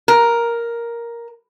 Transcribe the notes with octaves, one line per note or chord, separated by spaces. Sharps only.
A#4